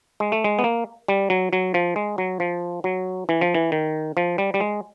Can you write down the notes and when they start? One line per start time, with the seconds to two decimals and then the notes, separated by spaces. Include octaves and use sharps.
0.20 G#3
0.32 A3
0.44 G#3
0.59 B3
0.64 A#3
1.08 G3
1.30 F#3
1.53 F#3
1.74 F3
1.96 G#3
2.18 F#3
2.40 F3
2.84 F#3
3.29 E3
3.41 F3
3.54 E3
3.72 D#3
4.17 F3
4.38 G3
4.54 G3
4.60 G#3